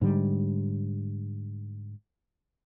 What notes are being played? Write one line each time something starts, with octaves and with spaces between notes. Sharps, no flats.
G#2 D3 G3